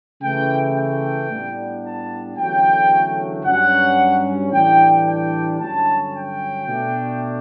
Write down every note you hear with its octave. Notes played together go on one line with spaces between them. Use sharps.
C#3 E3 A3 G5
G5
A2 G3 B3 D4
A5
E2 D3 F#3 A3 C#4 G5
G2 F#3 C#4 F#5
A2 E3 G3 D4 G5
G5
G2 D3 F#3 C#4 A5
G5
B2 A3 D4